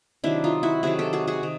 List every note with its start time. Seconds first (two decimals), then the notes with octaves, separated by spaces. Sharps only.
0.24 C3 D#3 F#3 D4 E4
0.44 D#4 F4
0.63 E4 F#4
0.83 C3 D#3 F#3 F#4 G#4
0.99 G4 A4
1.13 F#4 G#4
1.27 F#4 G#4
1.43 C3 D#3